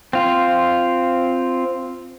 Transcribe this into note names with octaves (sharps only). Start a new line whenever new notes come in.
C4 F4